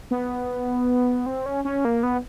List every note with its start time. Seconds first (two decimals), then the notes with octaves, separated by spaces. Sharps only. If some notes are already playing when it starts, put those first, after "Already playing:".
0.11 B3
1.26 C4
1.46 C#4
1.65 C#4
1.85 A#3
2.03 B3